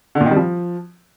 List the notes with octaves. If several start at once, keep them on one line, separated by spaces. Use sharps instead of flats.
D3
A#2
D#3
G3
F3